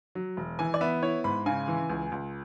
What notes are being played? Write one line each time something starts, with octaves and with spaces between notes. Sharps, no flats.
F#3
E1
E3 G#5
D5
B3 E5
E4 C#5
G#2 B5
C#3 G#5
E3
C#2
C#2